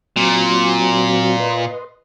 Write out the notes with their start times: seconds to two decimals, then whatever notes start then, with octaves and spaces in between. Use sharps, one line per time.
0.16 A#2 F#3 C4 F#4
1.40 B4 D#5 C6